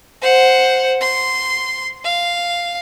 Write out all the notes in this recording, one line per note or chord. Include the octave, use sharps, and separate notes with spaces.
C5 F#5
C6
F5